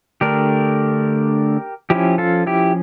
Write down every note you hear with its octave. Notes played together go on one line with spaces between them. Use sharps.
D3 A3 D4 G4 A#4
F3 C#4 E4 G4
F4 A4
E4 G4